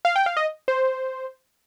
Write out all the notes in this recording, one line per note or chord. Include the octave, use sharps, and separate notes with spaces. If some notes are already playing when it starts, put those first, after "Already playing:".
F5
G5
F5
D#5
C5